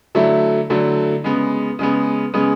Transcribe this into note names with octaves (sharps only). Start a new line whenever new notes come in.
D3 F#3 A3 E4
D3 F#3 A3 E4
C#3 G#3 B3
C#3 G#3 B3
C#3 G#3 B3